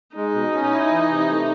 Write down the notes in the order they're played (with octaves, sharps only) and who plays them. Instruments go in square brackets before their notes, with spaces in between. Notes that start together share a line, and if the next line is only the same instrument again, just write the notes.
[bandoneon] G#3 [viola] D#4
[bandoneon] B2
C#4
E4
E3
C3
A3